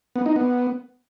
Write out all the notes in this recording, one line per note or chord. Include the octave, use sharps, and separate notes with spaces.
B3
D#4
B3